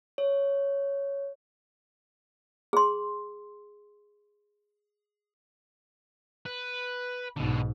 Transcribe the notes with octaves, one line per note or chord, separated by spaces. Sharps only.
C#5
G#4 C6
B4
B1 G#2 B2 D3